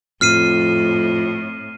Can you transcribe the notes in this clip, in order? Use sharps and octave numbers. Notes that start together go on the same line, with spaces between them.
F2 A2 F6 C7 D#7